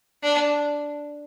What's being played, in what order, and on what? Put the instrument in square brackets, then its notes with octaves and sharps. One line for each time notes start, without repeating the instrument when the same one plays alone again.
[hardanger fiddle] D4